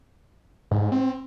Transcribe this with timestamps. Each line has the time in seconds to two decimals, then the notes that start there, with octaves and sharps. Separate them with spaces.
0.71 G#2
0.82 G#2
0.92 C4